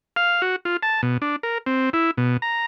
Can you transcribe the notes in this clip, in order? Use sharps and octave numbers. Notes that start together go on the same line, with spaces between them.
F5
F#4
F4
A5
B2
D4
A#4
C4
E4
B2
A#5